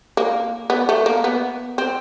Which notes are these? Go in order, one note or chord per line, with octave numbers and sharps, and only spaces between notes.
A#3
B3
A3
A#3
B3
C4